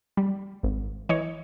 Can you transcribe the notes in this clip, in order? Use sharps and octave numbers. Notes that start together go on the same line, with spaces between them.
G3
G#1
E3 C#5 D#5